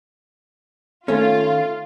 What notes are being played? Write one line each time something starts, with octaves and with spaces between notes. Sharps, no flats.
D#3 A3 C#4 F4